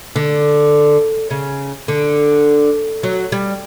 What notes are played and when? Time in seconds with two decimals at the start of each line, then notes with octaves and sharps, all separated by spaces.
0.16 D3
1.30 C#3
1.88 D3
3.03 F#3
3.32 G3